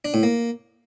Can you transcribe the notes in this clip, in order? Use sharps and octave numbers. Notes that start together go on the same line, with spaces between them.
D4
A2
A#3